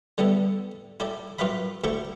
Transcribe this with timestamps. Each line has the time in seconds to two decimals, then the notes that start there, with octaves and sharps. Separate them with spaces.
0.18 D3 G3 B3 E4 A4
1.00 E4 G4 A4 D5
1.39 F#2 F4 G4 B4 E5 B5
1.84 D2 E4 G4 A4 G5 C#6